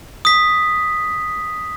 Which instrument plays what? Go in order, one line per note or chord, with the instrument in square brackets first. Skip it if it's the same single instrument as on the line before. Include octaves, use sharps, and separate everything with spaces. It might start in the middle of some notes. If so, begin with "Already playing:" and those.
[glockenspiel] D#6 B6